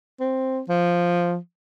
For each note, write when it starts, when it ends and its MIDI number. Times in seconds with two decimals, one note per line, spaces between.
0.20 0.60 60
0.68 1.36 53